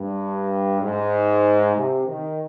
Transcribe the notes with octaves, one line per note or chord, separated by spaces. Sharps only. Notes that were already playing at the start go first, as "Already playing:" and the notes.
Already playing: G2
G#2
C3
D#3